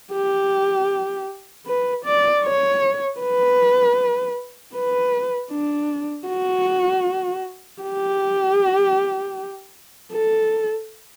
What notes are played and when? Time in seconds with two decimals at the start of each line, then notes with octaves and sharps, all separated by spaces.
0.13 G4
1.66 B4
2.05 D5
2.44 C#5
3.20 B4
4.74 B4
5.51 D4
6.28 F#4
7.82 G4
10.13 A4